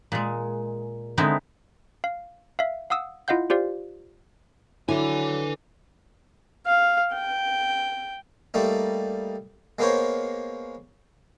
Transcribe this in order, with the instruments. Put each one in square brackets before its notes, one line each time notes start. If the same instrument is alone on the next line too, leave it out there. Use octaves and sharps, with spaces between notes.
[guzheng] A#2 G#3
D3 G#3 B3 C4 D#4 E4
[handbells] F5
E5 F5
F5 F#5 D#6 E6
E4 F4 D#5 F5 F#5 G6
F4 G4 C5 D5 F5
[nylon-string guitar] D3 [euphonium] F#3 [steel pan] E4 [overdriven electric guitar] B4 G#5
[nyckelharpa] F5
G5
[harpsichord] G3 A3 A#3 D#4
G#3 A#3 B3 A#4 C5 C#5